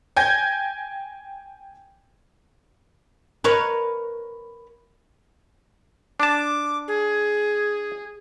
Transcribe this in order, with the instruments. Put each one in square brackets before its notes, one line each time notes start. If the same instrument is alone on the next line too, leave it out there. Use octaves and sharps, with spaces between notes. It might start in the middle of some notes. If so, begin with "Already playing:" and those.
[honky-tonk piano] G5 G#5 G6 G#6 A#6
[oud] A#4 B4 C#5
[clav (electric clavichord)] D4 A5 [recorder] D6
[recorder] G#4